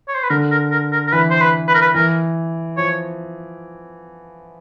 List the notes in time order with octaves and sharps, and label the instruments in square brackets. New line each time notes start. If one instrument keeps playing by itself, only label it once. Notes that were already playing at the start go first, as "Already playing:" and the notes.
[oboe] C#5
C5
B4
[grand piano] D3 [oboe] A#4
[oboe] A#4
A#4
A#4
A#4
[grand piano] E3 [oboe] B4
[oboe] C5
B4
B4
A#4
B4
[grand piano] E3 [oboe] A#4
[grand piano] F3 [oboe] C#5